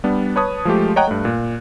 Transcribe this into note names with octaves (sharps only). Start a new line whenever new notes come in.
G3 B3 D4
B4 C#5 A5 D#6
F3 G#3 A3 G4
C#5 D#5 F#5 G5 A#5 F#6
G2 A3
A#2